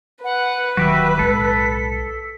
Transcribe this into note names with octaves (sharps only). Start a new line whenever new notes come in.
B4 F#5
D1 D#3 F#3 F#4 G4 E5 B6
B1 A2 G#3 A4